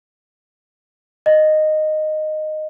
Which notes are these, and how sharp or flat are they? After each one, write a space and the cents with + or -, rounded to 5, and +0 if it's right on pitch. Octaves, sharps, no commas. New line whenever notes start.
D#5 -10